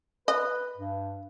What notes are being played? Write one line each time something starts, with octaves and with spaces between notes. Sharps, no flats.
B4 D#5
G2